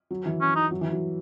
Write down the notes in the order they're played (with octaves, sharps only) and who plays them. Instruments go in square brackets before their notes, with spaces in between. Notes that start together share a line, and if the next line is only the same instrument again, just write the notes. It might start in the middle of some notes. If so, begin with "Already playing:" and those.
[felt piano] F#3
E3
[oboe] C#4
D#4
[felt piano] F#3
E3
F#3